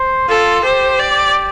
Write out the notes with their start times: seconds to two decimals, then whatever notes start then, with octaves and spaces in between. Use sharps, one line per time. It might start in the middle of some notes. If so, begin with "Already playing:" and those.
Already playing: C5
0.28 F4 A4
0.63 G4 C5
1.00 D5